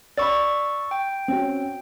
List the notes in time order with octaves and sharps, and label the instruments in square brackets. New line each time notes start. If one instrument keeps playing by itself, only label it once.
[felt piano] D5 B5 [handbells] C#6 E6 A6
[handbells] G5
[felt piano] C4 C#4 F#4